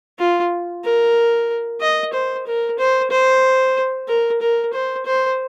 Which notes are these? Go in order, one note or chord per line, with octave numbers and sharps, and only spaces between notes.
F4
A#4
D#5
C5
A#4
C5
C5
A#4
A#4
C5
C5